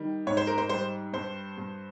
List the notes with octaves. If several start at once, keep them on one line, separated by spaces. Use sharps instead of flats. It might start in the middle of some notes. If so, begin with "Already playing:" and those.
Already playing: D#3 G3
G#2 C#5
C5
A#4
C5
G3 C5
G2 C5
G2